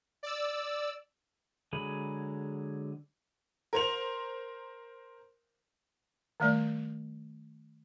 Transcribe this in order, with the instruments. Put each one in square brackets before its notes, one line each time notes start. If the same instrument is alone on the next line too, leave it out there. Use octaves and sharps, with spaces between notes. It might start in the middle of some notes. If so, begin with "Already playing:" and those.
[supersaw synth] D5 E6
[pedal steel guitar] D3 F#3 G#3 G#4 B5
[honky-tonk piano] A#4 C5 F7
[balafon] D#3 G3 A3 D5